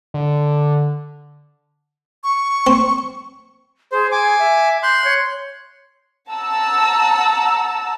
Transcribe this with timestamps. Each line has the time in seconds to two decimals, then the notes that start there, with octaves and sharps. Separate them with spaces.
0.14 D3
2.24 C#6
2.67 C4
3.92 G#4 C5
4.12 G#5 D6
4.39 E5
4.83 C6 F#6 G6
5.04 C#5
6.32 F#5 A5 A#5 E6